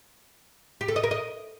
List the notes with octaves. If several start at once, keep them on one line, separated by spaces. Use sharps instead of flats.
G4
A4
D#5
A#4
D#5